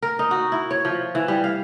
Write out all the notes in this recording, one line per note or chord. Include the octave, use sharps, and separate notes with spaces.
A#4
D#4
F#4
E4
C#5
F3
E3
G3
F5